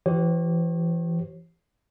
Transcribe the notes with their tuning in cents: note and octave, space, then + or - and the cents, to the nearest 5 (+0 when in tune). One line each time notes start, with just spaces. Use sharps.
E3 +30 G4 -25 C#5 -40